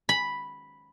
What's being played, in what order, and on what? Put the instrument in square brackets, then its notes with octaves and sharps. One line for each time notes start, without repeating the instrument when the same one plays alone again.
[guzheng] B5